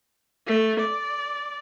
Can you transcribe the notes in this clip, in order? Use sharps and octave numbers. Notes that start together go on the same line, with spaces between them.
A3
D5